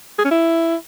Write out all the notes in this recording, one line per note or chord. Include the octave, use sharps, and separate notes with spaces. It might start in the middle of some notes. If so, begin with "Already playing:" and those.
G#4
C#4
E4